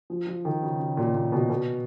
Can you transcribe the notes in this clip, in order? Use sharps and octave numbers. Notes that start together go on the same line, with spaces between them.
F3
F3
D#3
C#3
C#3
A#2
A#2
B2
B2